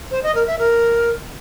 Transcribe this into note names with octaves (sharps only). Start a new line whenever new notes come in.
C5
D#5
A#4
E5
A#4